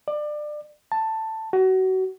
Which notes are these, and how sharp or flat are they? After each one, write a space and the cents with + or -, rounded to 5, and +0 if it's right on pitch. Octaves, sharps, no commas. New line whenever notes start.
D5 +25
A5 +10
F#4 +25